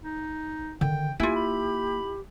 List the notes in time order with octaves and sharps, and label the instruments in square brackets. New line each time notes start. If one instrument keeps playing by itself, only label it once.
[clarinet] D#4
[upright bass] D3 D#3 [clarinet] G5
[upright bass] A#3 [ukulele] E4 F4 [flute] G4 [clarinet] G#5
[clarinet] B5